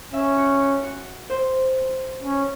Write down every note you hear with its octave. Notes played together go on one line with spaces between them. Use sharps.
C#4 E5
F#4
F#4
F#4
C5
C#4